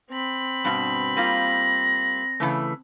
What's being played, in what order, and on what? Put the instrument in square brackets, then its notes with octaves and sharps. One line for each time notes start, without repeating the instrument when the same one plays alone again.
[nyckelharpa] C4 B5
[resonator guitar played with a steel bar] G2 B2
[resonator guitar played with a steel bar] G3 A#3 F4 [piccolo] A#6
[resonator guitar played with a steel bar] C#3 E3 A3